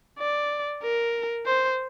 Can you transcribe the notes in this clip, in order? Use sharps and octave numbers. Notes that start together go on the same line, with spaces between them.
D5
A#4
C5